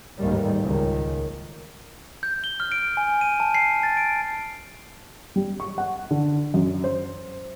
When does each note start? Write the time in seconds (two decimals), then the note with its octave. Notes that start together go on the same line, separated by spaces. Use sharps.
0.18 A1 D#2 G#2 D#3 G3
0.62 C#2 D#3
2.23 G6
2.44 G7
2.60 F6
2.72 D7
2.97 G#5
3.21 D#7
3.40 A5
3.55 C7
3.83 A6
3.97 D7
5.36 G3
5.60 C#6
5.78 F#5
6.11 D3
6.54 F#2
6.84 C5